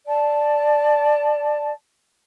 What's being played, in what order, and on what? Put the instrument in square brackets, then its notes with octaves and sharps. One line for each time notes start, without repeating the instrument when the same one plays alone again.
[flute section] D5 A5